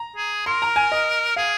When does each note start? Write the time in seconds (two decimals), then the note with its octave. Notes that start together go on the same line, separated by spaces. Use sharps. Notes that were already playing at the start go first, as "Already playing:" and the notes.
Already playing: A#5
0.16 G#4
0.46 A#4 C6
0.62 A#5
0.76 G#5
0.92 D#5
1.36 G#4 F5